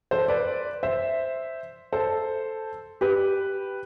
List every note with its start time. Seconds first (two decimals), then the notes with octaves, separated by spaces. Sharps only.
0.11 A4 C5
0.28 B4 D5
0.83 C5 E5
1.92 A4 C5
3.01 G4 B4